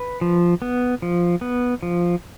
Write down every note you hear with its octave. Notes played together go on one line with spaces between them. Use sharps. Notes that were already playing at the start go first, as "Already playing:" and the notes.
Already playing: B4
F3
B3
F3
B3
F3